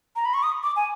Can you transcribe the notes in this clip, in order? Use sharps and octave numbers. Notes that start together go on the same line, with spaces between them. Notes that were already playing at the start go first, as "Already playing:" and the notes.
A#5
B5
C#6
D#6
D6
G#5